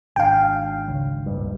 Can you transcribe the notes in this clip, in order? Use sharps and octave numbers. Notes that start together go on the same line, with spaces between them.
G#1 D4 F5 G5
C#2
D1 A#1 G2